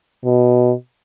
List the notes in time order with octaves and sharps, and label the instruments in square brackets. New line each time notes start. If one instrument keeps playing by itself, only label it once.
[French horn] B2